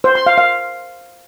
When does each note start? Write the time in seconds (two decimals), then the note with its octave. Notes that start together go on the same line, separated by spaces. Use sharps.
0.04 C5
0.15 C6
0.26 F5
0.38 F5